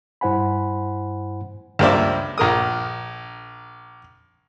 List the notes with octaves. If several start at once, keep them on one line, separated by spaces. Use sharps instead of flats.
G2 E4 C5 F#5 G#5 B5
C#2 G2 A#3 C5 D5 E5
A#1 A#4 D#6